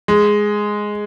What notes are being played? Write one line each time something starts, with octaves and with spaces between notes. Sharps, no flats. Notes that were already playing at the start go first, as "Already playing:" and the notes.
G#3